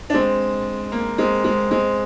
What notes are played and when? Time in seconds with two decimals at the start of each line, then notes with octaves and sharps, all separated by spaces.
0.10 D4
0.14 G#3 C4
0.92 A#3
1.18 G#3 C4
1.44 G#3 C4
1.71 G#3 C4